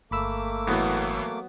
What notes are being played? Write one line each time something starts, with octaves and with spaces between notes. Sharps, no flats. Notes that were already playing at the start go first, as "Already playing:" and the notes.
G1 A3 A#3 B5 D6 E6
A2 E3 F#3 B3